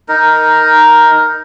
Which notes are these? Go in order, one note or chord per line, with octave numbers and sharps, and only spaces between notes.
D#4 A#4